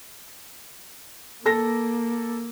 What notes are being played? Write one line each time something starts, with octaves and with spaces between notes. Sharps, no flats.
A#3 A4 A#6